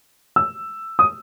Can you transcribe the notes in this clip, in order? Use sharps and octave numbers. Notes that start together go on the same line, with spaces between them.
E6
D#6